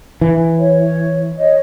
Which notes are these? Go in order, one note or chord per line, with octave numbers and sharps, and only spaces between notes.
E3
C#5
C#5 D#5